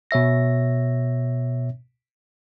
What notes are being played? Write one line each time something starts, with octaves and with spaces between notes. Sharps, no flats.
B2 C#5 E5 A#6